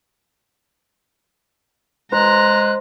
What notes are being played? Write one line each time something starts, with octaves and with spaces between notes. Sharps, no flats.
G#3 C5 A#5 F#6